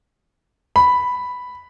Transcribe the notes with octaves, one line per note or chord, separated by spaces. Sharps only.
B5